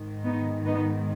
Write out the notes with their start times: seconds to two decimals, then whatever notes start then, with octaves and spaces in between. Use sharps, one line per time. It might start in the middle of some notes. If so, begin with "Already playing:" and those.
Already playing: G#2 D#3
0.24 B3 D#4
0.65 B3 D#4